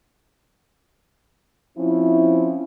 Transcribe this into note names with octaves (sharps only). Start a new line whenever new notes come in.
F3 C4 C#4 E4